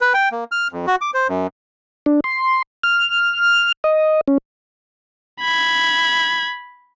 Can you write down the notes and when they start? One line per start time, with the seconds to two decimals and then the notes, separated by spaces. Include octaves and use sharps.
0.01 B4
0.14 G5
0.32 A#3
0.52 F6
0.72 F2
0.87 F#4
1.01 D6
1.14 C5
1.29 F#2
2.06 D4
2.24 C6
2.83 F6
3.84 D#5
4.28 C#4
5.40 B5 G#6